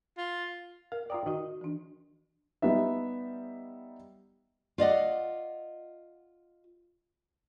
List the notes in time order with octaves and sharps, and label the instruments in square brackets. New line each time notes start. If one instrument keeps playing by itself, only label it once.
[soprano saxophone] F4
[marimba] A#4 [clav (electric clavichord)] F5
[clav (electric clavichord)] F4 A#4 D5 [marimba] G5 D#6
[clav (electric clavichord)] D#3 D#5 [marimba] D#4 F#4
[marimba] E3 D4
[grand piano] G3 B3 D#4 E5
[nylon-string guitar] F4 D5 D#5 F#5